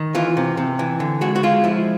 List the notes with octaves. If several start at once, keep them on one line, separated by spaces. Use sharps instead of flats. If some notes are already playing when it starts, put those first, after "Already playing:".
Already playing: D#3
E3 F4
C3
C3
E3
D3
G#3 F#4
F#4
G#3 F4
F3 E4